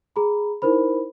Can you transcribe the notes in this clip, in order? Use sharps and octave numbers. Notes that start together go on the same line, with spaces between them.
G#4 A#5 B5
D#4 E4 A#4 C5 B5